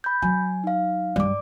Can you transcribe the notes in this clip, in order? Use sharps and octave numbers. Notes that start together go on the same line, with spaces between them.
B5 G6
F#3 G#5
D#4 F5
G2 G3 D5 D6